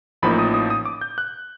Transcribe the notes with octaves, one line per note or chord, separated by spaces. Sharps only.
A1 A2 F3 A#3 D#4 B5
D#6
D#6
D#6
D6
G6
F#6